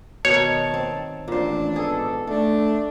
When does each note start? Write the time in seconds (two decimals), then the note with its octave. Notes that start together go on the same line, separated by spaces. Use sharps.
0.25 B2 D#3 C#5 A5
0.74 C4
1.28 A1 A#2 D4 C5
1.76 G#2 B3 G#4 A4
2.27 A3 D4 A4